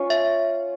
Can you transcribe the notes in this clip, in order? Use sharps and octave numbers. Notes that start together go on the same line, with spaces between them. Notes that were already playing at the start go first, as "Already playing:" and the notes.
Already playing: C#4 F4 C#5
E5